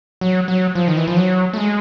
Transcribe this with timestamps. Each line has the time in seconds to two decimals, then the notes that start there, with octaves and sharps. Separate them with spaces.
0.21 F#3
0.48 F#3
0.75 F3
0.88 D#3
0.97 E3
1.08 F3
1.17 F#3
1.53 A3
1.57 G#3